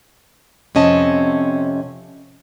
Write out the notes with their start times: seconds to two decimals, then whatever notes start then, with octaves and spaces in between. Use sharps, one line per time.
0.75 F2 C3 C#4 D#5 A5